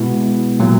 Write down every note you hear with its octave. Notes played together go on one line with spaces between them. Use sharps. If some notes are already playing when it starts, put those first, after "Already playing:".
Already playing: B2 G#3 B3 E4
A#2 F#3 A#3